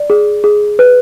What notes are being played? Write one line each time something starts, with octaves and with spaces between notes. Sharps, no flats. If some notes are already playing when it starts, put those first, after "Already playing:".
Already playing: D5
G#4
G#4
B4